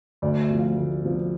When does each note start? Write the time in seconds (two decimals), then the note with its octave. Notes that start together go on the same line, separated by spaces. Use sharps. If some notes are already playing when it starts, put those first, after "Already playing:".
0.22 D2 D5
0.40 E5
0.49 C3 F3
0.59 F5
0.77 D2
1.03 C3 F3